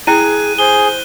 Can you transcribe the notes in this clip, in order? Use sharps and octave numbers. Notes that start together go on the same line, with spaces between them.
E4 G#4 G5 F#6 D#7
G#4 C5 G7